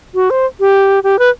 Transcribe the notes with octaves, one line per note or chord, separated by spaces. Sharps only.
F#4
C5
G4
G4
B4